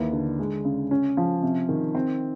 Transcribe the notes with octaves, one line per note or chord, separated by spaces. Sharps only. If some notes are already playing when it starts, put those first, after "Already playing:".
Already playing: D#2 E3
D3
G#3
C#3
C#4
F3
C3
D#3
C4